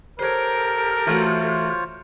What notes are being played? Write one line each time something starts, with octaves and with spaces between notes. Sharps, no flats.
G4 A4 A#4 C5 C#5 F6
E3 A3 F4 F#4 C5 C#5